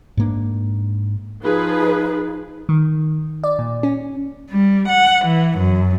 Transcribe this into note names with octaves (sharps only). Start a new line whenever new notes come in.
G#2 A#3 D4
F3 D#4 G#4 B4
D#3
D5
A#2
C#4
G3
F#5
E3
F#2